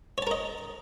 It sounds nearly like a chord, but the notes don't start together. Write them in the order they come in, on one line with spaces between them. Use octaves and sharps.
C#5 A5 A#4 D#5